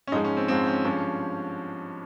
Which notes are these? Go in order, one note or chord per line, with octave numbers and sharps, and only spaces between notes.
C#4
G#2 F3 G#3 D#4
C#4
C4
G#2 F3 G#3 C4
C#4
G2 F3 G#3 C#4